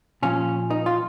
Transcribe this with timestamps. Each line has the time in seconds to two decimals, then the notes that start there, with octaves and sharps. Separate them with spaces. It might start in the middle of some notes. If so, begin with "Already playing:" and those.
0.23 A#2 F3 C#4
0.70 D#4
0.86 F4